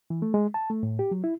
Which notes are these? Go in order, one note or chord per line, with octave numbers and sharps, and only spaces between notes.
E3
A3
G#3
A5
A3
A2
G4
F#3
E4